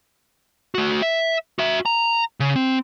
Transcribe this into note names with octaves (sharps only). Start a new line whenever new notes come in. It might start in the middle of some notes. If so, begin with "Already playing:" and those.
A3 F#4
E5
F#4 E5
A#5
C#3
C4